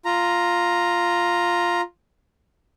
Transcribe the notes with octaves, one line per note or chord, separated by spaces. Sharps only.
F4 A#5